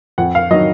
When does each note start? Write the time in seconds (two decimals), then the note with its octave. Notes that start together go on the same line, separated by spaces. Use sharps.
0.18 F2 F#5
0.35 F5
0.51 D#3 F#3 D#5